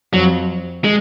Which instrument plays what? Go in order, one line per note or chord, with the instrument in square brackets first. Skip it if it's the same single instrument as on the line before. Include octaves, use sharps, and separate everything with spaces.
[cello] F2 [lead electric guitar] F#3
[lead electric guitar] G#3